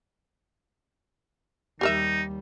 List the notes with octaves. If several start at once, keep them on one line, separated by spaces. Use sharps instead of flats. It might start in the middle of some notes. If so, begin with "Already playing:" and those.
D#2 G3 D#4 G4 A#4 E5